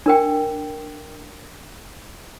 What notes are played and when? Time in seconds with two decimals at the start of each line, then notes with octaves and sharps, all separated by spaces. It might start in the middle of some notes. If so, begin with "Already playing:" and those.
0.06 D4 A#4 G5